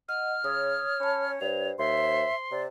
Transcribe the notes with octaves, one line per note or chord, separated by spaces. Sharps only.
D#5 F#5 F6
C#3 C#5 D#6
C#4 A5 B5
G2 C5 F7
D#2 E5 C6
C3 D5